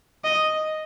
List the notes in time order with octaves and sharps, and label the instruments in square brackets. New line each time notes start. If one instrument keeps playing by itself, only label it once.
[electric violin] D#5